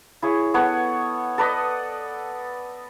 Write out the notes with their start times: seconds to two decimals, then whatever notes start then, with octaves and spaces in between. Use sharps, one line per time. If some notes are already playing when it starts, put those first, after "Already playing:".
0.22 E4 G#4 C#5
0.54 B3 A4 C#5 F#5
1.38 A4 B4 D5 D#5